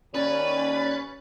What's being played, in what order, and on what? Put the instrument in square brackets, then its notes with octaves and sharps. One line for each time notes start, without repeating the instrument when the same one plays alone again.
[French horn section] D#2 C#5 [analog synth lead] C#4 [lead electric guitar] B4 [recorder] D5